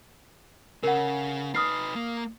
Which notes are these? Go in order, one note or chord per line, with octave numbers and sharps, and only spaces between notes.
C#3 A#4 F#5
D#4 B4 D#6 F6 C7
A#3